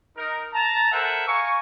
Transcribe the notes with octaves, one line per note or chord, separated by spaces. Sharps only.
D#4 A#4
A5 A#5
A4 A#4 C5 E5 F#5 G#5
F5 G#5 A#5 C#6